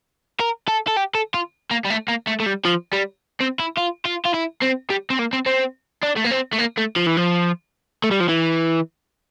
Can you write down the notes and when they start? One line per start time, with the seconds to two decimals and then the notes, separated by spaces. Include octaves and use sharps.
0.40 A#4
0.68 A4
0.87 A4
0.96 G4
1.15 A4
1.34 F4
1.71 A#3
1.85 G3
1.90 A3
2.08 A#3
2.27 A3
2.40 A3
2.46 G3
2.65 F3
2.93 G3
3.40 C4
3.59 E4
3.78 F4
4.06 F4
4.26 F4
4.34 E4
4.62 C4
4.90 G3
5.10 C4
5.19 A#3
5.33 C4
5.46 C4
6.03 D4
6.16 A3
6.24 A#3
6.31 C4
6.53 A3
6.59 A#3
6.78 A3
6.96 F3
7.07 E3
7.17 F3
8.04 A3
8.11 G3
8.20 F3
8.29 E3